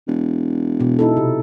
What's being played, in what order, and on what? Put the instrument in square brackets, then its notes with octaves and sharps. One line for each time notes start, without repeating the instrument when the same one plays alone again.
[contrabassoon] E1
[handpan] B2
D#4 E4 A4
C3